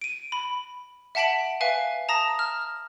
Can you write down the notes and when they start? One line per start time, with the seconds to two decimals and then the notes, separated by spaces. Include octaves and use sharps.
0.01 D7 D#7
0.32 B5
1.15 E5 F#5 A5 B6 D7 F#7
1.61 B4 E5 F5 G#5
2.09 A5 A#5 D#6 A#6
2.39 F6